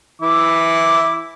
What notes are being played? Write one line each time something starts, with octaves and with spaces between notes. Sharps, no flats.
E3 E4 D6